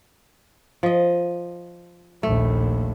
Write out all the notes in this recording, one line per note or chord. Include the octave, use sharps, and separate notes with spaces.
F3 D#5
A#1 D#2 A3